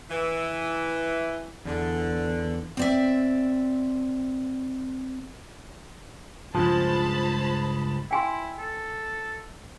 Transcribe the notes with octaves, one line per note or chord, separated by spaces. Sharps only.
E3
E2 D3
C4 D5 E5
C#2 G2 F3 G#3 C5 A5 B5
E4 G5 G#5 C6
A4